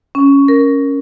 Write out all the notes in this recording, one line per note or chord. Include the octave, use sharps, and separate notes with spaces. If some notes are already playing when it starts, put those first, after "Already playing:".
C#4
A#4